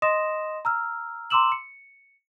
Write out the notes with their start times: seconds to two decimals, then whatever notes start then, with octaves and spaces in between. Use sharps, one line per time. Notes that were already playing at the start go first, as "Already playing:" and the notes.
0.02 D#5 C6 D#6 A#6 E7
0.65 A#5 E6 F6
1.30 A#5 C6 D6 E6 E7 F#7
1.52 C#7